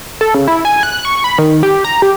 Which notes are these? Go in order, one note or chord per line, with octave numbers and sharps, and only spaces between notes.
A4
C#3
E4
G#5
F#6
C#6
B5
D#3
G4
A#5
G4